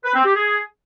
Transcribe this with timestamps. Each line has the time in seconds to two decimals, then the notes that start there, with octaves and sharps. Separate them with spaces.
0.04 B4
0.15 C4
0.25 G4
0.36 G#4